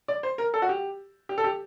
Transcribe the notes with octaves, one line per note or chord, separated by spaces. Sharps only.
D5
C5
A#4
A4
F#4
G4
G4
A4
G4